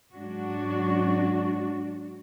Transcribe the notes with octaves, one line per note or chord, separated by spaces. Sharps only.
G#2 F#3 D4 F#4